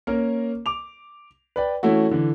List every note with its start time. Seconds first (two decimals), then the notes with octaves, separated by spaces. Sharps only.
0.07 A#3 C#4 A#4
0.66 D6 F7
1.56 B4 D5 G5
1.83 E3 A3 C#4 E4 F#4
2.11 D3 E3